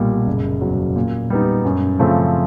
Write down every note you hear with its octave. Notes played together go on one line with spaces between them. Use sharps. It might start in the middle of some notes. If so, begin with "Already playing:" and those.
Already playing: B1 A#2 G3
F#1
E2 B2 F#3
A#2
G3 B3 D#4
F#2
C#3 F3 A3 C4